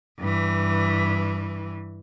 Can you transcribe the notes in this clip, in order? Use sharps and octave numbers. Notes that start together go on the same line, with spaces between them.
G2 E3